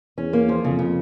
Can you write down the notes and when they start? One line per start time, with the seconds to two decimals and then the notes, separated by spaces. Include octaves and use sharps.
0.18 E2 C#4
0.33 A#3
0.49 F3
0.64 F2 C#3
0.79 C#3